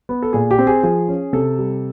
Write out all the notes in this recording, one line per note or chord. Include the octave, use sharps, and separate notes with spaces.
B3
A4
A#2 G#4
G4
C4
G#4
F3 G#4
C#4
C3 A4
G3